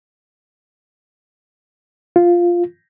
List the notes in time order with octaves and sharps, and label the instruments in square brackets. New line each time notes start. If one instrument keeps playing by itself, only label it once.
[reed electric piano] F4